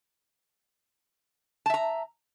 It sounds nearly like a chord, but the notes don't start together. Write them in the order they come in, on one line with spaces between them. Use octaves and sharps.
A5 E5 A#5